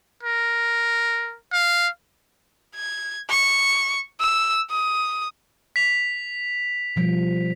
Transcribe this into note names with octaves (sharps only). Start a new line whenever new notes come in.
A#4
F5
G#6
C#6
E6
D#6
B6 F7
B2 F3 G3